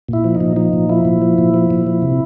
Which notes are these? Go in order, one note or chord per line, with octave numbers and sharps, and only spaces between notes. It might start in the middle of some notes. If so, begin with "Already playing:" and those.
A#2 E4
F3
D#4
A#2
F3 D#4
A#2
F3 E4
A#2
F3
A#2
F3
A#2
F3
C3